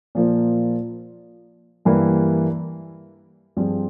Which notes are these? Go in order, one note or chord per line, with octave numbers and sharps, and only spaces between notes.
A#2 F3 A#3
G2 E3 A#3 E4 G4
G2 F3 C4 F4 G#4